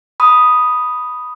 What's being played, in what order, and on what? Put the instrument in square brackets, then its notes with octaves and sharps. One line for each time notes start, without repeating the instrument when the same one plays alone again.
[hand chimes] B5 D#6